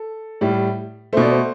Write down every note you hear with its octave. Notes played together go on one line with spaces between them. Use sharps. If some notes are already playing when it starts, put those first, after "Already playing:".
Already playing: A4
A2 G3
B2 A3 C5 D5
C5